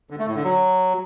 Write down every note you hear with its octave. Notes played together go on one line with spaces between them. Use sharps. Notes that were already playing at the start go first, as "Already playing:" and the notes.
D3
A3
A2
D3
F#3